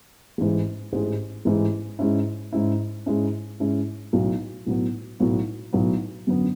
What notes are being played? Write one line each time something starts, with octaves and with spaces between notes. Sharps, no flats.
A1 G#2 E3 G#3
A1 G#2 E3 G#3
A1 G#2 E3 G#3
G#2 G#3 C#4 E4
G#2 G#3 C#4 E4
G#2 G#3 C#4 E4
G#2 G#3 C#4 E4
B1 A2 F#3 B3
B1 A2 F#3 B3
B1 A2 F#3 B3
B1 A2 F#3 B3
F#2 D3 F#3 B3